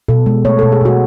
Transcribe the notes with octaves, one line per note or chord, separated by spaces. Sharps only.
B2 A4
G#3
A3 C#5
A4
B2
G#4
B2 F#4